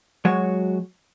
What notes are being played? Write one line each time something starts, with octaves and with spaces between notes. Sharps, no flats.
F#3 G#3 F#4 C#5